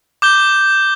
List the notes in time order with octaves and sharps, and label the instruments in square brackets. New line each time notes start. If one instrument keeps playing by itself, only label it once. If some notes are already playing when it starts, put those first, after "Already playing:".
[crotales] D6 G6 G7